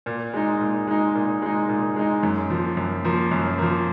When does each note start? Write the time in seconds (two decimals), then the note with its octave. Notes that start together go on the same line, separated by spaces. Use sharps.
0.06 A#2
0.34 G#3 D#4
0.61 A#2
0.88 G#3 D#4
1.15 A#2
1.42 G#3 D#4
1.69 A#2
1.96 G#3 D#4
2.23 F#2
2.50 F3 A#3
2.77 F#2
3.05 F3 A#3
3.31 F#2
3.59 F3 A#3